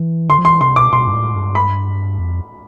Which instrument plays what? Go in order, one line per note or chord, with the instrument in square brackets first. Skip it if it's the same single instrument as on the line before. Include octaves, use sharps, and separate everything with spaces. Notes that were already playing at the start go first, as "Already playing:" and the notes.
Already playing: [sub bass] E3
[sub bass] D3 [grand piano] C6
[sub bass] F3
[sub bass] E3 [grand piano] C6
[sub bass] C3 [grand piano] C6
[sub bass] B2 [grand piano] D6
[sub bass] B2 [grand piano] C6
[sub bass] G2
A2
G2
[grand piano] B5
[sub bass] F2